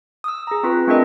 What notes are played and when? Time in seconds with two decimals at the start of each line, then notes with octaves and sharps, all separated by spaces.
0.24 D#6 E6
0.47 G#4 A#5
0.63 C4 F4 B4
0.87 A3 C4 D4 G#4 A#4 D#5